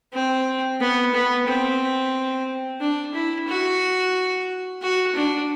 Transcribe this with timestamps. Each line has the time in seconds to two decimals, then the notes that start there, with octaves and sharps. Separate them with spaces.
0.13 C4
0.80 B3
1.14 B3
1.47 C4
2.81 D4
3.14 E4
3.49 F#4
4.82 F#4
5.16 D4